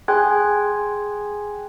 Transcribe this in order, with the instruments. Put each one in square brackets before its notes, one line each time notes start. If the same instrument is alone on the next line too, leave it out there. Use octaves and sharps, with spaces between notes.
[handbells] G#4 G5 G#5 C6 F#6 G#6